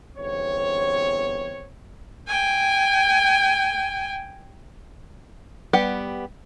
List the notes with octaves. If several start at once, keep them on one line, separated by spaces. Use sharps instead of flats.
G1 E2 C4 C#5
G5 G#5
G3 B3 G4 F#5